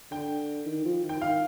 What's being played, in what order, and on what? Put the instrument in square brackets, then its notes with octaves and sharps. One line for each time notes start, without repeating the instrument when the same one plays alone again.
[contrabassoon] D3 [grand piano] G5
[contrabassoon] D#3
F3
D#3
[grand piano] G5
[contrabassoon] D#3 [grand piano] F5